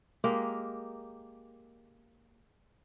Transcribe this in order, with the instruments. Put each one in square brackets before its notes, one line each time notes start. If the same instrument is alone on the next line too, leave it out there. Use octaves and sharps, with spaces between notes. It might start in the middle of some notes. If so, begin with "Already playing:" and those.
[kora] G#3 A#3 G4 A#4